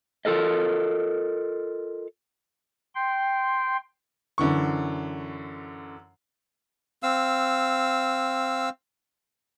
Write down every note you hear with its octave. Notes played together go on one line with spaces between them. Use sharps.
F4 A4 A#4 D#5
G5 C6
F#2 D3 E3 C#6
C4 F5 E6